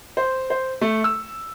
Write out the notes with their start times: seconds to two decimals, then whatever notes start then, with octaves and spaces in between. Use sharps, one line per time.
0.17 C5
0.50 C5
0.81 A3
1.04 E6